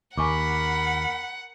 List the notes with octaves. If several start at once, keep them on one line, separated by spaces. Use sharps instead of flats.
D#2 A#4 F#5 G#5 B5 C#6 D6